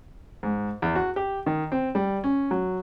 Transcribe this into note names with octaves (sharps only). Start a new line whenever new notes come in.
G#2
E2
F#4
G4
D#3
C4
G3
C#4
F#3